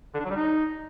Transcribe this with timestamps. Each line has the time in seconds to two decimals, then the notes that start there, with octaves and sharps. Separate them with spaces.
0.14 D3
0.19 D4
0.25 F#3
0.30 G3
0.36 D#4